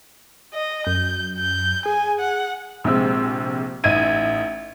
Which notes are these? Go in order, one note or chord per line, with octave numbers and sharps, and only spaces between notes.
D#5
F#2 G6
G6
G#4 G#5
F#5
A#1 C3 G#3 C4 E6
A1 D#4 E5 G#6 D#7